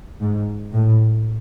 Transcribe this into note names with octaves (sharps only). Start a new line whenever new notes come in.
G#2
A2